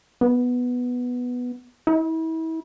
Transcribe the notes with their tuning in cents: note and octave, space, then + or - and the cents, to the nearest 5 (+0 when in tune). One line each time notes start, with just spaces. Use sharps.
B3 +0
E4 -35